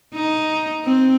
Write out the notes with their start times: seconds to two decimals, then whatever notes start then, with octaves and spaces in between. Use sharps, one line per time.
0.14 D#4
0.85 C4